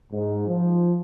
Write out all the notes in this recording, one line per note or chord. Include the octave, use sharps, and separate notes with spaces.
G#2
F3